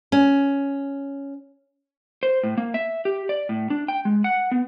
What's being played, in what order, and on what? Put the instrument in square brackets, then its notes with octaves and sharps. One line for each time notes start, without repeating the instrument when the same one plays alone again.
[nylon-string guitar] C#4
[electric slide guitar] C5
A2
A#3
E5
G4
D5
A2
D4
G5
G#3
F#5
B3